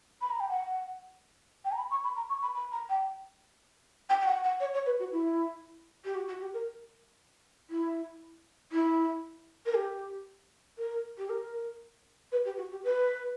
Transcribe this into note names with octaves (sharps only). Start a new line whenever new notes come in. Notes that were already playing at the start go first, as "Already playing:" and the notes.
B5
A#5
G5
F#5
G5
A#5
B5
C#6
B5
A#5
C#6
B5
B5
A#5
G5
G5
G5
F#5
F#5
C#5
C#5
B4
F#4
E4
G4
F#4
F#4
G4
A#4
E4
E4
A#4
G4
A#4
G4
A#4
B4
G4
F#4
G4
B4